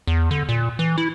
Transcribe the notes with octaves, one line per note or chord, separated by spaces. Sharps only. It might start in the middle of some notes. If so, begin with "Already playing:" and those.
E2
D3
A#2
E3
E4